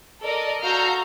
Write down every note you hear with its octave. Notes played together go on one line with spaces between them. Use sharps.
A4 A#4 D5 D#5
F#4 A4 F5 A#5 F6 G6